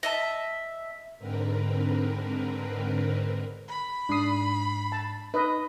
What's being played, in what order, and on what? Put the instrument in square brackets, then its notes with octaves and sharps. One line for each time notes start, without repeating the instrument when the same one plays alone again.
[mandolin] D#5 E5 A5
[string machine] G#2 D3 C4 A#4 B4
[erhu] B5
[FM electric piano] G#2 C7 [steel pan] D4 D#6
[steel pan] A5
[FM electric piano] D#4 [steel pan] B4 D#5